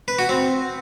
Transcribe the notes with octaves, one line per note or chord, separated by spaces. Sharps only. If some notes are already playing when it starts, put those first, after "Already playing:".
B4
F#4
C4